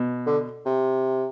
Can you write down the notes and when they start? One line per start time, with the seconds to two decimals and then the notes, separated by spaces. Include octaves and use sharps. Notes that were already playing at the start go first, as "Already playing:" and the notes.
Already playing: B2
0.26 D3
0.66 C3